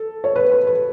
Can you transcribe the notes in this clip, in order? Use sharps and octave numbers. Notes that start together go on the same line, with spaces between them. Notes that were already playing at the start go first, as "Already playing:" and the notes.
Already playing: A4
C#5
B4
B4
B4